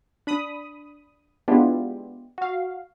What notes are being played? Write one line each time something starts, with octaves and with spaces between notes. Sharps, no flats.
D4 B5 D#6
G#3 B3 D4 E4 F4 G4
F#4 F5